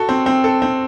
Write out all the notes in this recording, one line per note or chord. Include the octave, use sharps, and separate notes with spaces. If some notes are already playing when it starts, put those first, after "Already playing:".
Already playing: F#4 A4
C4
C4
A4
C4